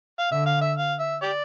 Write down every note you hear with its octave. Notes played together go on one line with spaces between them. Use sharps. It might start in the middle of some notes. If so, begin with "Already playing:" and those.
F5
D3 E5
F5
E5
F5
E5
G4 D5